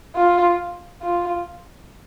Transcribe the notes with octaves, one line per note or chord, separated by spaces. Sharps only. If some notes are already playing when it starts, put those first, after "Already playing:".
F4
F4